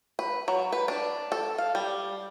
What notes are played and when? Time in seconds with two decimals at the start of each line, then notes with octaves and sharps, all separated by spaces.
0.19 B4
0.48 F#3
0.72 B4
0.88 D4
1.32 A4
1.58 F5
1.75 G3